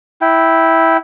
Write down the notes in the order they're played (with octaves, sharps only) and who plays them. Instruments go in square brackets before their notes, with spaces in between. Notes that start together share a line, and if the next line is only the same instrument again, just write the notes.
[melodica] E4 G5